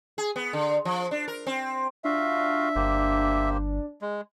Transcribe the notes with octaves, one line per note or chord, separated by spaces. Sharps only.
G#4
B3
D3
F3
D4
A#4
C4
D4 F4 F#4 E5 F5
G1 A#3 G4 C5
G#3